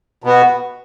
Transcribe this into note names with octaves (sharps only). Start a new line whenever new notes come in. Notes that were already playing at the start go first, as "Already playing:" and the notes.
B2 B3 F#4